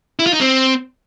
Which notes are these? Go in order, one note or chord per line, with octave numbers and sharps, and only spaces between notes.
E4
F4
D#4
C4